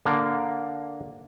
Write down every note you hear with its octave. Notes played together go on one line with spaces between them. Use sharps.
D3 A#3